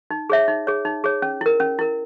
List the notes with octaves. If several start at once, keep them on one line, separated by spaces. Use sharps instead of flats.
D#4
G#4 C#5 E5
D#4
G#4 C#5
D#4
G#4 C#5
C#4
E4 A#4
C#4
E4 A#4